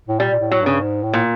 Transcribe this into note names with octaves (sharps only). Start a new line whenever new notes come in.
A2
A#2 G3
A#2
A2
F#3
G2 C#3
G#2
A2
A#2